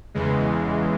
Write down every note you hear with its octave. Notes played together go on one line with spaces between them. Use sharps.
E2 C#3 E3 G#3